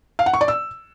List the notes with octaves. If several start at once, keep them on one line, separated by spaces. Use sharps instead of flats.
F5
F#5
C#6
D5
E6